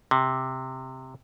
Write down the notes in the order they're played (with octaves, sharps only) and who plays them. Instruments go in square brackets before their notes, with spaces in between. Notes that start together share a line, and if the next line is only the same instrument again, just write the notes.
[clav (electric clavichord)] C3